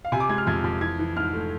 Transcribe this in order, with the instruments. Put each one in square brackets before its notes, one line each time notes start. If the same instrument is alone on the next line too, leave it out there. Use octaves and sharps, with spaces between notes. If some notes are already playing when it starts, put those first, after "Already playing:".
[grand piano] F5
C3 G#5
D6
G#3 G#6
F6
F2 G#6
F2
E3 G#6
E3
G#2 F6
A3